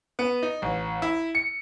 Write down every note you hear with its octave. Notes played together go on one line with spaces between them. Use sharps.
B3
D#4
A1
E4
C#7